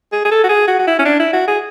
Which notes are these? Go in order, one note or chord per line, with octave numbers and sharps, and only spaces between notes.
G#4
G#4
A4
F#4
G#4
F#4
F#4
E4
C#4
D4
E4
F#4
G#4